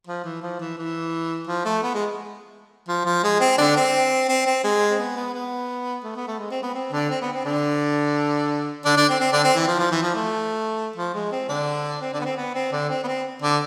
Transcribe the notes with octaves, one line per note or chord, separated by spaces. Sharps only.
F3
E3
F3
E3
E3
F3
A3
B3
G#3
F3
F3
G#3
C4
D3 D4
C4
C4
C4
G#3
C4
B3
B3
B3
A3
B3
A3
G#3
C4
B3
C4
D3 D4
C4
B3
C4
D3 D4
D3 D4
D3 D4
C4
C4
D3 D4
C4
E3
F3
F3
E3
F3
A3
F3
G#3
C4
D3 D4
C4
D3 D4
B3
C4
B3
C4
D3 D4
C4
B3
C4
D3 D4